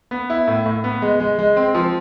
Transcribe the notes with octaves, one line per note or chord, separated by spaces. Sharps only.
B3
E4
A2
A2
B3
G#3
G#3
G#3
C4
F3